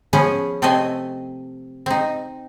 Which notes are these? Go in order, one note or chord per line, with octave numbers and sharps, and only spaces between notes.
F3 B3 C#4 G#4
C3 A3 C4 A4 D#5 G#5
C4 D#4